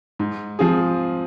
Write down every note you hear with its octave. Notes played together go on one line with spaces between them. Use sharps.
G#2
F3 C4 F4 G#4